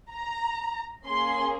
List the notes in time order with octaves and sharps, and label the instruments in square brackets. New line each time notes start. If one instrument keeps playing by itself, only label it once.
[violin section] A#5
A#3 C#4 G#4 C6